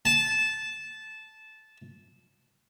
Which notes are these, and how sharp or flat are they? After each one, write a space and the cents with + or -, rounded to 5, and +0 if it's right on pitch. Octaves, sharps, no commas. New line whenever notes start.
A5 -15